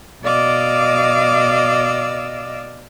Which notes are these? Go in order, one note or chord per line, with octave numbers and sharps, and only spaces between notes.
B2 D5 D#5 F5 D6 E6